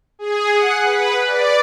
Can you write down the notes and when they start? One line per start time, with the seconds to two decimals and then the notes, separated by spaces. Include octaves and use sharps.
0.19 G#4
0.53 F#5
0.84 B4
1.27 D5